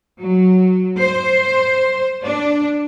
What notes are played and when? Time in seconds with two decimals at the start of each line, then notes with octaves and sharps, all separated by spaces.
0.20 F#3
0.98 C5
2.22 D4